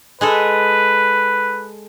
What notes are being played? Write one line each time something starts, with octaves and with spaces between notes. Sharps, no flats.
G#3 G#4 A4 B4